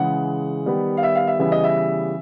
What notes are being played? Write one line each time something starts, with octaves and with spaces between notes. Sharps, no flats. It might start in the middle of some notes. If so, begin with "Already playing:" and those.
Already playing: C#3 E3 G#3 F#5
D#3 G3 B3
F5
E5
F5
E5
C#3 E3 G3 B3 E5
D#5
E5